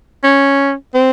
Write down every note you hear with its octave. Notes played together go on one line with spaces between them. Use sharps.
C#4
C4